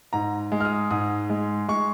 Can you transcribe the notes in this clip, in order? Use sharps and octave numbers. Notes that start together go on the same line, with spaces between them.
G#2 A#5
G#3
F6
D#6
G#2 D#6
G#3
G#3 C#6